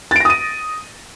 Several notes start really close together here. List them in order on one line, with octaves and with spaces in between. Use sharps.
A6 D7 A#6 D#6 D#7